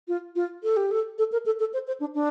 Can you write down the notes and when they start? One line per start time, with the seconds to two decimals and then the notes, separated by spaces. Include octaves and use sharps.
0.08 F4
0.36 F4
0.63 A4
0.77 G4
0.91 A4
1.18 A4
1.32 A#4
1.46 A4
1.60 A4
1.73 C5
1.87 C5
2.00 D4
2.15 D4